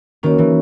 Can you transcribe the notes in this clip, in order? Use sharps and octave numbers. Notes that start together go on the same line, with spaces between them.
D#3 A#3 C#4 F#4 A#4 C#5
E3